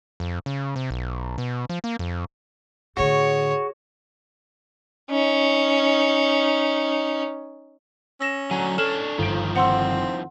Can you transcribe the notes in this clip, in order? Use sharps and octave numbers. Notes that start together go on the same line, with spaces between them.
F2
C#3
C3
B1
B2
F3
A#3
F2
A2 D3 F#4 G#4 C#5
C#4 D#4
C#4 E6 A#6 E7
D3 F#3 G#5 A#5
D4 A4 C#5 F6 E7
G1 D#3 F3 D7
C4 F#5 C6 E6